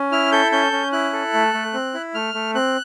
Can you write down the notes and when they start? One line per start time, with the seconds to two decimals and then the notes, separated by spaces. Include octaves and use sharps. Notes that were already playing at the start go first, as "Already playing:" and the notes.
Already playing: C#4
0.12 E4 F6
0.32 A4 G6
0.52 C#4 G6
0.72 C#4
0.92 E4 F#6
1.13 A4
1.34 A3
1.54 A3
1.73 C4
1.94 E4
2.14 A3 F6
2.34 A3
2.55 C4 F#6